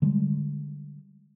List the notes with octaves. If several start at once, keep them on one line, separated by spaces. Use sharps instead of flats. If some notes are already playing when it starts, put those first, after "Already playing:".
D3 G3 G#3